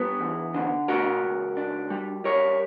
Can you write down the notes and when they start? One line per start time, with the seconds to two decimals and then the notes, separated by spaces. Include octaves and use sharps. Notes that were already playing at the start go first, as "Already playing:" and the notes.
Already playing: G3 B3 D4
0.20 E2
0.54 D3
0.88 B2 F#4 A#4
1.23 C#2
1.57 D4
1.90 G3
2.24 G3 A#4 C#5